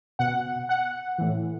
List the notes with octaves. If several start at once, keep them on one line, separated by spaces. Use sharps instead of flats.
B2 F#5
F#5
A2 E3